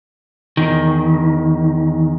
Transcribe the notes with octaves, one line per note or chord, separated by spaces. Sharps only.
E2 D#3